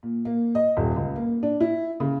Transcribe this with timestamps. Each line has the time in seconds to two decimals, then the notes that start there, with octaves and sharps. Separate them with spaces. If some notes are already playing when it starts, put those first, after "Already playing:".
0.03 A#2
0.25 A#3
0.55 D#5
0.77 D#1
0.96 C#2
1.16 A#3
1.43 D4
1.60 E4
2.00 C#3